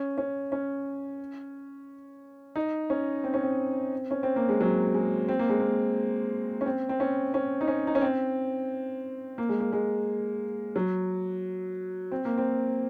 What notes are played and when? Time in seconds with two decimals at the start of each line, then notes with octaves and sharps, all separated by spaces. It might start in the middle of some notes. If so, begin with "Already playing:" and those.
Already playing: C#4
0.18 C#4
0.52 C#4
2.56 D#4
2.90 C#4
3.24 C4
3.34 C#4
3.43 C4
4.11 C#4
4.23 C4
4.36 A#3
4.49 G#3
4.61 F#3
4.94 G#3
5.28 C4
5.39 A#3
5.50 G#3
5.60 A#3
6.61 C#4
6.66 C4
6.89 C4
7.00 C#4
7.34 C#4
7.61 D#4
7.68 C#4
7.87 D#4
7.95 C#4
8.01 C4
9.38 A#3
9.49 G#3
9.60 A#3
9.73 G#3
10.76 F#3
12.12 C4
12.25 A#3
12.38 C4